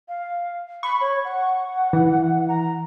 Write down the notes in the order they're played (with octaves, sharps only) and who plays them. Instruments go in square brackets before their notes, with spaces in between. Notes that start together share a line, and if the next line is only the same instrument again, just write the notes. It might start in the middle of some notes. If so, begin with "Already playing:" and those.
[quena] F5
[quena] B5 [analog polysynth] C#6
[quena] C#5
F#5
[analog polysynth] E3
[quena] A#5